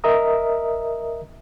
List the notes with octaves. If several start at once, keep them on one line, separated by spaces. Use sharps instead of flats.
A#4 D#5 E5 A#5 D#6